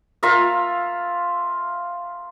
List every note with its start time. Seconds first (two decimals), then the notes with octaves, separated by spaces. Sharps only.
0.23 F4 A#4 E5 F5